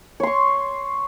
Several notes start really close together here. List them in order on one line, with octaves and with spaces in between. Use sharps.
C#5 C6 C#6